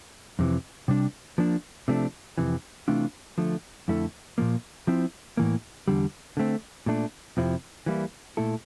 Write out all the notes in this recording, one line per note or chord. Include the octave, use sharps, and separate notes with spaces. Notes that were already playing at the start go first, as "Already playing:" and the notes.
F2 C3 E3
C3 G3 D4
F3 A#3 D4
C3 F3 A3 D4
F2 C3 E3
C3 E3 A3 D4 F4
D3 F3 A3
F2 D3 A3 E4 A4
A#2 F3 A#3
F3 C4 E4
A2 E3 A#3
E2 D3 G3
D3 A3 C4
A#2 A3 D4
F2 C3 F3 C4 E4
E3 G3 A#3 E4
A#2 A3 E4 A4